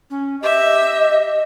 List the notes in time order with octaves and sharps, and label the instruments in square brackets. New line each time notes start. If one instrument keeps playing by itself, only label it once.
[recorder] C#4
[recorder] G4 [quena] D#5 [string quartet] E5